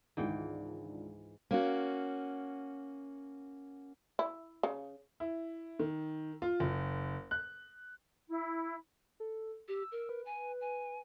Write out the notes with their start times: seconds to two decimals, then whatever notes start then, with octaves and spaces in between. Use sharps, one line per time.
0.17 C#2 G#2 D#3 E3 D4 G5
1.51 A#3 C#4 F#4
4.19 E4
4.63 C#3
5.20 E4
5.79 D#3
6.42 F4
6.60 F#1
7.31 F#6
8.28 E4
9.20 A4
9.68 G4 E6
9.92 A#4
10.09 B4
10.25 G#5
10.61 G#5